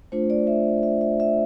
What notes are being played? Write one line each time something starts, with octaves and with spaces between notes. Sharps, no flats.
A3 D4 F4 C5
D5
E5
E5
E5
E5